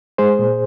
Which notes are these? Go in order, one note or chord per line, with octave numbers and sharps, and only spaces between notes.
G#3 G#4 C5
A#2